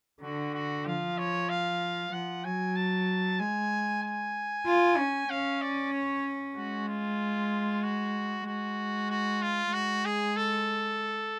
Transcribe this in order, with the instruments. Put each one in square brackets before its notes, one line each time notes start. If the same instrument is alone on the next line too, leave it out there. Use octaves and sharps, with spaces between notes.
[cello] D3 [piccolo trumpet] F#4
[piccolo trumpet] F#4
[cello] F3 [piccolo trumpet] F5
[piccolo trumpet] C#5
F5
[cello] F3 [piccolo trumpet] F#5
[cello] F#3 [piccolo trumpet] G#5
[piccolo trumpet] A5
[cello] G#3 [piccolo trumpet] G#5
[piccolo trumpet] G#5
[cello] F4
C#4
[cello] C#4 [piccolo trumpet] F5
[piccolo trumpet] D5
C#5
[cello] G#3 [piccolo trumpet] F#4
[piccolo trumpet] F4
F#4
[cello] G#3 [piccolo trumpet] F#4
[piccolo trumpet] F#4
F4
[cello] G#3 [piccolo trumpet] F#4
[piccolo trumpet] G#4
A4